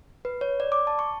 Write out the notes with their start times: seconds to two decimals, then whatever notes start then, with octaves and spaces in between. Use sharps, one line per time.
0.25 B4
0.41 C#5
0.60 D5
0.72 D6
0.87 A5
0.99 C#6